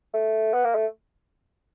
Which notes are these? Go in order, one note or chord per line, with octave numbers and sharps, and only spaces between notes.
A3
B3
A#3
A3